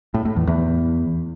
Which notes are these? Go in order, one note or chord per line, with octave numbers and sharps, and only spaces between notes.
A2
A2
E2
E2